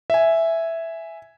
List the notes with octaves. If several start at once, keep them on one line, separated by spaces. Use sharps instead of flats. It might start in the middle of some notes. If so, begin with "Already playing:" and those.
E5 G#5